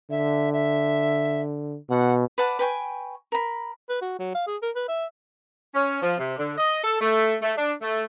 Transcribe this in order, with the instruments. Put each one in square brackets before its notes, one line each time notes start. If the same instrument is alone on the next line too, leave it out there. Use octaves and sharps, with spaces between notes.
[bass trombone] D3 [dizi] E5
[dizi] E5
[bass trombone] B2 [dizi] F#5
[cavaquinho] B4 D5 F#5 A5
B4 G5 G#5 C#6
A#4 B5
[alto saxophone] B4
F#4
F#3
F5
G#4
A#4
B4
E5
[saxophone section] C#4
F3
C3
D3
D#5
A4
A3
A3
D4
A3